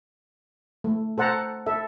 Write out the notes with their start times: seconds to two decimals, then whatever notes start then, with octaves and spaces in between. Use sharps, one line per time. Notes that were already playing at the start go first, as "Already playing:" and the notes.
0.84 A3
1.18 A4 C5 F#5 A5 A#5
1.66 A4 E5